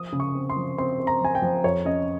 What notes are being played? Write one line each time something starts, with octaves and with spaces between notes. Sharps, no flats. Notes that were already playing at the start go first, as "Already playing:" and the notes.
Already playing: F3 D#6
C#3
C#6
C4
C6
F3
C4 C6
C4
A#5
F3 G#5
G5
F3
F2 C#5
C#4 D#5